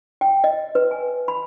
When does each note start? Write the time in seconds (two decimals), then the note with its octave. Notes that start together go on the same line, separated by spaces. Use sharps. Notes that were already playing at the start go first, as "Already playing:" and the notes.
0.21 G5
0.44 D#5
0.75 B4
0.91 G#5
1.28 B5